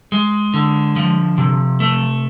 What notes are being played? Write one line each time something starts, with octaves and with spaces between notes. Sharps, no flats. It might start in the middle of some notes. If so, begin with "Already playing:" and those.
G#3
D3
F3
C3
A3